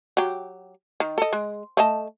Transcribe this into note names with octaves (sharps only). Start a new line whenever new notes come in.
F#3 G4
D#3
A4 D#5
G#3
A3 D#5 A5